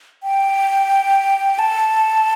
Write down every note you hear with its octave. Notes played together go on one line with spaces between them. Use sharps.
G5
A5